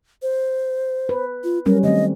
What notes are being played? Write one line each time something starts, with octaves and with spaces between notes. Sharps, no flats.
C5
B4
F4
F#3 G3 C#4 A#4
D#3 A3 C4 D#5